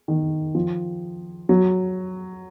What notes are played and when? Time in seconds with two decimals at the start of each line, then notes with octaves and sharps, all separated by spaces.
0.08 D#3
0.55 F3
1.49 F#3